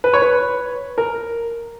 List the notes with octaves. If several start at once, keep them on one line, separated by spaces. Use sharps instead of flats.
B4
C#5
B4
A#4